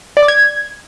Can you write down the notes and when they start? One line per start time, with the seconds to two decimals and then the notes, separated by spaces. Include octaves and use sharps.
0.17 D5
0.23 D6
0.28 G#6